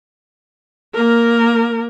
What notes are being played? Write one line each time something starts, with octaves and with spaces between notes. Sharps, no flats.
A#3 A#4